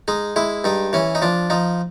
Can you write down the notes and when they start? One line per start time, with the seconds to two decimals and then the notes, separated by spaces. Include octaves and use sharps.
0.08 G#3 D#4
0.36 G#3 E4
0.64 G2 D#4
0.93 E3 C#4
1.15 D#4
1.22 F3 D4
1.50 F3 D#4